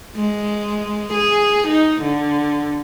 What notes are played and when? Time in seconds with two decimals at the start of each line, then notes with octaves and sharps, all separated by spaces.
0.16 G#3
1.14 G#4
1.68 D#4
2.02 D3